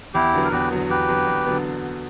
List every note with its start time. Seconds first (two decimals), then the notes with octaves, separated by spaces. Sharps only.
0.14 E2 E4 G4
0.34 D3 F#3 B3
0.45 A#4
0.52 E2 G4 B4
0.71 D3 F#3 B3
0.90 E2 G4 B4
1.09 D3 F#3 B3
1.27 E2
1.46 D3 F#3 B3